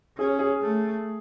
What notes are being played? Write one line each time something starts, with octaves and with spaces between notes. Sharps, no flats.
C#4 G#4
G#4
A3